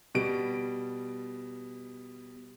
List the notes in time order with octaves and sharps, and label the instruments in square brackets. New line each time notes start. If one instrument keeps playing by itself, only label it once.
[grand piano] B2 G3 D7